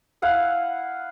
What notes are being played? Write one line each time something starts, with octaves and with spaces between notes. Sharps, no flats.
E4 F5 F#5 G#5